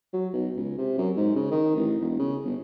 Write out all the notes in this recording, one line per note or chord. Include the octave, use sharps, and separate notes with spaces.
F#3
B1
C#2
C3
F#2
G#2
C#3
D#3
A1
E1
C#3
G1